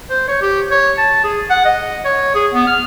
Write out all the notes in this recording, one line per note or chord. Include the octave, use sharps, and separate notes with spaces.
C5
C#5
G4
C#5
A5
G#4
F#5
D#5
C#5
G#4
B3
F6